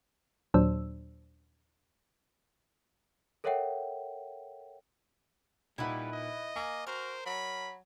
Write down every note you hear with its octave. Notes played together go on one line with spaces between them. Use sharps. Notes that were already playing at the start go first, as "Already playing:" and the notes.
D#2 A#2 F#3 D4 C5 E6
A4 A#4 C#5 E5 F#5 G5
A#2 G3 D#4 E4 B4 F#5
D#5
A#3 G#5
F#4 A#4 C5
F#3 B5